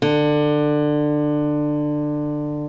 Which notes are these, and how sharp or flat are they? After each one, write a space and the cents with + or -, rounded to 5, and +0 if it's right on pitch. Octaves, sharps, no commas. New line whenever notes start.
D3 +20